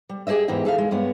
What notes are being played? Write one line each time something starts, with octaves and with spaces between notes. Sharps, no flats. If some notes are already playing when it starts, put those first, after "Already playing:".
G3
G4 G#4 C5 D#5 E5
E2 G#2 E3 G4 D#5
G#4 A4 E5 F5
G#3
G2 G#3 B3 C#5